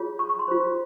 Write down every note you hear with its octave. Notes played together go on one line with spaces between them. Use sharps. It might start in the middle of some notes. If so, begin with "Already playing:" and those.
Already playing: F4 G#4 C#5
C#6
C#6
C6
F4 C5